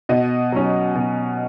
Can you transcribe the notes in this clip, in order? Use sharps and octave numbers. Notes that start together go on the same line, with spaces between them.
B2 D#5
F#3 C#4
B2